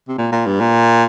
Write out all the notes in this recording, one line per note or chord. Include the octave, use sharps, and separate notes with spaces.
C3
A#2
A#2
G2
A#2